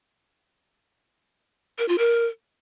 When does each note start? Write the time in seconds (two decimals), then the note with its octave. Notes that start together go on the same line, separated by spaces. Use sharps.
1.79 A#4
1.88 F4
1.98 A#4